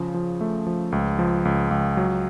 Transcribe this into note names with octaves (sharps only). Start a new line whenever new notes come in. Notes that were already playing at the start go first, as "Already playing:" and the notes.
Already playing: C#3 F3
F3
A3
F3
C#2
F3
C#2
C#2
F#3